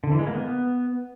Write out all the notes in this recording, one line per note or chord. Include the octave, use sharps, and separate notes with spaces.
D3
E3
G#3
A#3
B3